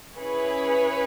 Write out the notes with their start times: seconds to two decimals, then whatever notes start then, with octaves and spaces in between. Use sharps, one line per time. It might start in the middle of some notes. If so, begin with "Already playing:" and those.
0.18 C#4 E4 G#4 B4 C#5